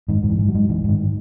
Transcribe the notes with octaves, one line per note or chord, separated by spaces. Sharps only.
G#2 D#3
G#2 D#3
E3
G#2
F#3
G#2
G#2 E3
G#2 D#3